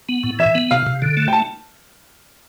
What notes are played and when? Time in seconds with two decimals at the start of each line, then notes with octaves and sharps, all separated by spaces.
0.09 B3
0.23 A2
0.39 E3 E5
0.55 B3
0.71 C3 F5
0.86 C3
1.02 D3
1.17 A3
1.28 G5
1.33 A5